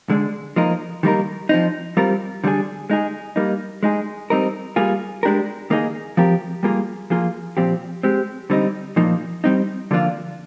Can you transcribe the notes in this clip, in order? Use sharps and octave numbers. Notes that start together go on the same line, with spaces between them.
D3 G#3 D4
F3 A#3 D#4 A#4
D#3 G3 A#3 D#4 A#4
F3 C4 D#4
G3 C4 F4 A#4
D3 G3 D4 G#4
G#3 D#4 G#4
G3 A#3 D#4
G#3 D#4 G#4
G3 C4 D#4 A#4
G3 A#3 F4 G#4
G#3 D4 G4 A#4
D#3 A#3 D#4 G#4
F3 C4 G4 A#4
G3 A#3 F4 G#4
F3 A#3 F4 G#4
A#2 F3 C4 G4
G#3 C4 G4
D3 G3 C4 D#4
A#2 F3 A#3 D#4
G3 C4 D#4
D3 F3 A#3 D4 F4